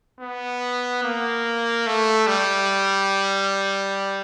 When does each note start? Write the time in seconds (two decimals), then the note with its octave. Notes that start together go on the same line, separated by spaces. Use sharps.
0.21 B3
1.04 A#3
1.87 A3
2.27 G3